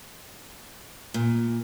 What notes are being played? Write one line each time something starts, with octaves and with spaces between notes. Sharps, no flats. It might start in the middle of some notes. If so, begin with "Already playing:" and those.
A#2